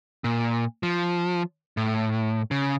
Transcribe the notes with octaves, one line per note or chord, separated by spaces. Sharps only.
A#2
F3
A2
C#3